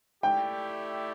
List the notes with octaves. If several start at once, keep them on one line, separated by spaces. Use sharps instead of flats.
A3 E4 G4 D5 G5